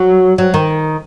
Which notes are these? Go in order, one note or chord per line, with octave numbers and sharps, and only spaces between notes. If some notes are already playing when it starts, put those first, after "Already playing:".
Already playing: F#3
F#3
D#3